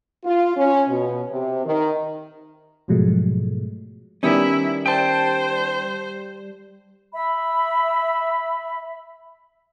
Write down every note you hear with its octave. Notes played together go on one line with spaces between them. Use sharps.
F4
C#4
B2
C3
D#3
G#2 B2 F3 F#3 G#3 A3
D#3 G3 B3 C#4 E4 G4 D5
C5 G5 A5
E5 B5